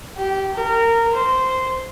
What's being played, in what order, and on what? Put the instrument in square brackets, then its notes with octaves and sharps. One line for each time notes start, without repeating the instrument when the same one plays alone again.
[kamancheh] G4
A#4
C5